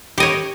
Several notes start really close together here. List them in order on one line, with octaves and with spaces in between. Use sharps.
G4 D#5 C#5